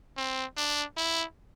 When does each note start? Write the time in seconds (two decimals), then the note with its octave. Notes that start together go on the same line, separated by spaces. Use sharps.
0.17 C4
0.57 D4
0.97 E4